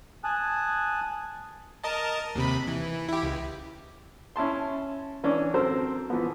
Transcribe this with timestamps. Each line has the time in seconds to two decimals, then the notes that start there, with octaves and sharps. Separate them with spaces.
0.24 G#5 A5 D#6 F#6
1.84 A#4 D#5 A5
2.35 D#2 C3 B5
2.67 E3
3.09 E4 G4
3.23 C#2
4.36 C#4 E4 A5 C6
5.24 E3 C#4 D4
5.54 F#3 C4 A4 A#4 C5
6.10 E3 F3 B3